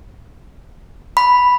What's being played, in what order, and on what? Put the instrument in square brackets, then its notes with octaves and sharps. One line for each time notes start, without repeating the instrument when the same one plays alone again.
[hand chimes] B5